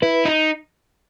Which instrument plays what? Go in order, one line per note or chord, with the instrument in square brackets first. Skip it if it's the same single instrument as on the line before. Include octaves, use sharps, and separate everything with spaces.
[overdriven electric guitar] E4 [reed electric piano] B4
[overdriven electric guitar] D#4